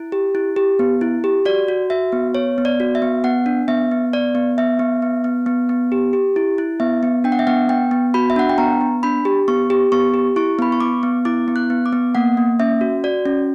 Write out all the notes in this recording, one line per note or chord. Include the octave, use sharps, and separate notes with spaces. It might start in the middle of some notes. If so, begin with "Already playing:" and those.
Already playing: E4
G4
E4
G4
B3
E4
G4
F#4 D5
F#4
F#4 E5
B3
B3 C#5
B3
D5
F#4
E5
B3
B3 F#5
D4
B3 E5
B3
B3 D5
B3
B3 E5
B3
B3
B3
B3
B3
G4
G4
E4
E4
B3 E5
B3
D4 G5
F#5
E5
B3 F#5
B3 G5
B3
F#4 B5
E5
D4 F#5
G5
B3 A#5
B3
D4 B5
G4
B3 C#6
G4
B3 C#6
G4
E4 C#6
B3 B5
C#6
B3 D6
B3
E4 D6
B3
F#6
B3
D6
B3
A#3 F#5
A#3
C#4 E5
F#4
F#4 D5
C#4